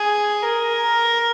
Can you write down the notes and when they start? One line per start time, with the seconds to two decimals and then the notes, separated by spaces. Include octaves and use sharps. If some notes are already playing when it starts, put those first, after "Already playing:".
Already playing: G#4
0.44 A#4